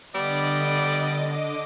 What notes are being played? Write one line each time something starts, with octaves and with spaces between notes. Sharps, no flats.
D3 G3 B3 D5 D#5 D6